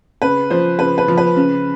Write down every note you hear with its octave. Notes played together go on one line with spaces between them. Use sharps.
C#3 B4
F3 C5
C#3 B4
B4
F3
B4
C#3